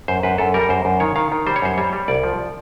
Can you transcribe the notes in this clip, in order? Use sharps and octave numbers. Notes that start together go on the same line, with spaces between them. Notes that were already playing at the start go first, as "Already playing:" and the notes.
F#2 C5
F#2 B4
F#2 A4
G3 A#4
F#2 C5
F#2
D#3 C#5
D#3 F5
D#3
G3 C5
C#5
F#2 C5
G3 C#5
G3
C2 D5
F3